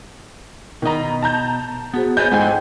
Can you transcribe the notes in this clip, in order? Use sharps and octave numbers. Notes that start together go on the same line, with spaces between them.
B2 D#3 D#5 A#5
A5 A#5 G6
B3 F#4 G#4 C5
B4 C#5 D#5 G#5 B5 G6
G#2 F4 A4 C5 D#5 G5 G#5